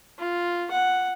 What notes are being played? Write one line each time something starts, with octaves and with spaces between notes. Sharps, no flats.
F4
F#5